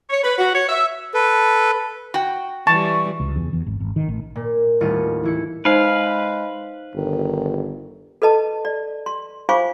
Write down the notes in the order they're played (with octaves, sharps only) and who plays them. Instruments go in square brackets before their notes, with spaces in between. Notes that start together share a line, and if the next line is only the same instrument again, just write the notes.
[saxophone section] C#5
B4
F#4
C#5
E5
[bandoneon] A4 B4
[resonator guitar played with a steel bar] F#4 G5
[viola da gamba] E3 G3 [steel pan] A5 [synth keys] C#6
[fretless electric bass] C#2
E2
E2
G#1
G#1
D#3
A1
[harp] A#2
D#1 A2 E4 F4 C#6 D#7
E3 E4 C#7
[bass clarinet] G#3 [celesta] D#4 C5 [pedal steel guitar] B4 F5
[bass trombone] G1 [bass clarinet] D#3
[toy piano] A4 B4 D#5 A5
D5
C6
F4 C5 F5 G#5 C#6 D6